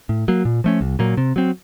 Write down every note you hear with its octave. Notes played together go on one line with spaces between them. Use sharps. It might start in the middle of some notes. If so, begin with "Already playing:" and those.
A2
F#3 A#3
A#2
F3 A3 C#4
C2
A#2 F#3 A#3
C3
F#3 C4